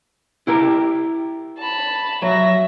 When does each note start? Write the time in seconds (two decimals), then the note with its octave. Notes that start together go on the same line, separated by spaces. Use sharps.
0.47 E4 G4 A#4
1.59 A5 B5
2.22 F#3 E5 A#6